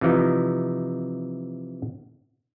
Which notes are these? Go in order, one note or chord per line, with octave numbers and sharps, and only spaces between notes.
C3 E3 F3 D#4